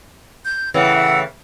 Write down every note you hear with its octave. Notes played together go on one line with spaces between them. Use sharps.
G6
A2 C#3 E3 F#5 E6